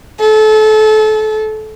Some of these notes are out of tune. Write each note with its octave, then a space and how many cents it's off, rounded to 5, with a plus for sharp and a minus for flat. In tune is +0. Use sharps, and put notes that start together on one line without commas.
A4 -30